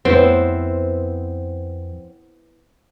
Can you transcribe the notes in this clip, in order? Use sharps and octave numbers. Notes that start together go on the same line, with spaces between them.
F2 B3 C4 E4